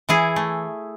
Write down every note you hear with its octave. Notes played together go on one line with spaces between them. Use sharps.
E3 E4 G#4
A3